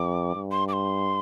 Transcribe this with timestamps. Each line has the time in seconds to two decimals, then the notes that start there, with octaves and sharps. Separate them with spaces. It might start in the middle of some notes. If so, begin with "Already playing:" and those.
Already playing: F2 D6
0.35 G2
0.51 C6
0.68 D6
0.73 C6